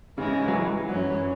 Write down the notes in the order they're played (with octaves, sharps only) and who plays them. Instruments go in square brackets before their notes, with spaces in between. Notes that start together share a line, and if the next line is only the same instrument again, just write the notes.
[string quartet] G#2 E3 G#3 E4 [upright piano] C#3
[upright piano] F#3
E3
[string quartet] F#2 E3 C#4 [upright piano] F#3